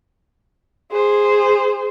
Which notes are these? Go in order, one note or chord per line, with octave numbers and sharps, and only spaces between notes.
G#4 C5